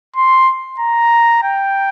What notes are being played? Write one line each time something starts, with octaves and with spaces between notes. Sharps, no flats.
C6
A#5
G5